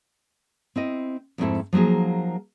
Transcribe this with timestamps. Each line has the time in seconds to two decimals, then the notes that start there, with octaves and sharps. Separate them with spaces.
0.76 C4 E4 D#5
1.38 F2 G#2 A3 C4 E4 A4
1.73 F3 F#3 A#3 D#4 G#4